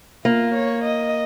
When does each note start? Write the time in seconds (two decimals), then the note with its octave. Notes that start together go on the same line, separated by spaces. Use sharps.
0.25 A#3 F4
0.54 C#5
0.84 D#5